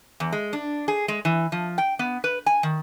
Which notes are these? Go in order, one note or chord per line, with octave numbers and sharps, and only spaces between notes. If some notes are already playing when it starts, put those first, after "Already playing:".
E2
G#3
D4
G#4
G#3
E3
F3
G5
B3
B4
G#5
D#3